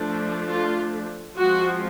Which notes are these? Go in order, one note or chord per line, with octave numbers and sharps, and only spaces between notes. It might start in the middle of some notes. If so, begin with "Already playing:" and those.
Already playing: F3 A3 D4
F4
F3 G#3 C4 F#4